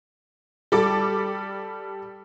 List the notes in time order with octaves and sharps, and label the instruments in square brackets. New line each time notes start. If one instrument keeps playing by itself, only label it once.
[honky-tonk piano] G3 A4 D6